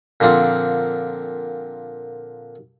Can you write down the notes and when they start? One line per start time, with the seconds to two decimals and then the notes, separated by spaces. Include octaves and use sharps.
0.20 A#2 D3 F3 C4 F4